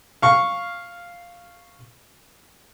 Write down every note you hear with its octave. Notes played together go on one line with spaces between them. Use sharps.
F5 C#6